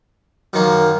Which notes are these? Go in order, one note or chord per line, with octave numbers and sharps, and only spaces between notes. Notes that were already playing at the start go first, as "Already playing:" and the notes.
F#2 D#3 A#3